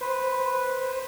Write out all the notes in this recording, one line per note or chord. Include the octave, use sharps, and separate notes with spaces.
B4 C5